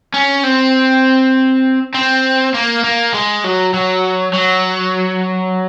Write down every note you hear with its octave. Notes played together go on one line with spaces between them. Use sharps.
C#4
C4
C4
A#3
A#3
G#3
F#3
F#3
F#3